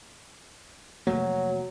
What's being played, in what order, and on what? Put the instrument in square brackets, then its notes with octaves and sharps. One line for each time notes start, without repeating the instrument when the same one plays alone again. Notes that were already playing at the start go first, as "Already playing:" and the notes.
[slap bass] F1 A3 A#3 [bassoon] F#3